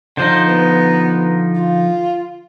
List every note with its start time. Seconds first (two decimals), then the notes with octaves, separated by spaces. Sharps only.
0.17 D3 F3 D#4 C5
0.48 B3
1.55 F4